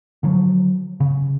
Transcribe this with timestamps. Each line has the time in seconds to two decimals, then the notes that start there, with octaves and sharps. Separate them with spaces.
0.23 D3 F3 F#3
1.00 C#3